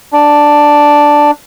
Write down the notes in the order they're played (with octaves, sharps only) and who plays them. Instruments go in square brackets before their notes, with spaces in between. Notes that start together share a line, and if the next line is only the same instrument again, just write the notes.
[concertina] D4